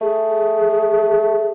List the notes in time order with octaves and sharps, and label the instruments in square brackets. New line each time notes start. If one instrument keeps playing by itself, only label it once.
[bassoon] A3 [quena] G#4